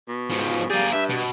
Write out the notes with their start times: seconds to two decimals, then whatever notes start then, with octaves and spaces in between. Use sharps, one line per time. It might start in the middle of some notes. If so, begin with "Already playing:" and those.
0.09 B2
0.30 G#2 F3
0.70 G3 A#3 G#4
0.93 G2 E5
1.10 B2